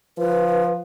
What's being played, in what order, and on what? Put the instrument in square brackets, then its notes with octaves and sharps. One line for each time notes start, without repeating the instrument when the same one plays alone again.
[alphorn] F3 [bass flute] B4